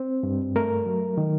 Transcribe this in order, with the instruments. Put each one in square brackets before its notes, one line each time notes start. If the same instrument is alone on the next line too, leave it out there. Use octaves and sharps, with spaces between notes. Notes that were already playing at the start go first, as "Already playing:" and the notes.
Already playing: [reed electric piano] C4 C5
G2
A3 A#4
F#3
D#3